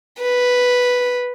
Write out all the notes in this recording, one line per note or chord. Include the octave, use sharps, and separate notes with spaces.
B4